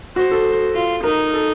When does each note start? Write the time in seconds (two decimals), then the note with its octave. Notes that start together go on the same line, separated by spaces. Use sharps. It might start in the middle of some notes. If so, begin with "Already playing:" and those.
0.16 F#4 C5
0.31 A4
0.75 F4
1.04 D#4 A#4
1.34 A4